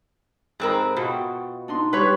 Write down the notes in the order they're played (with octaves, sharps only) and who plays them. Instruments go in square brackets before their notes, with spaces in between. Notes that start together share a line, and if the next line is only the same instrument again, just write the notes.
[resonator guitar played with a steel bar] G#2 C4 A#4 [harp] G#4 B5
[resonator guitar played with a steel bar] B2 [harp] F4 F#4 G5
[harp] D4 D#4 C6
[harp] G3 G4 [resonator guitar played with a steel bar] B4 C#5